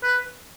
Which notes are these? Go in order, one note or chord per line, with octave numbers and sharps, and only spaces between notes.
B4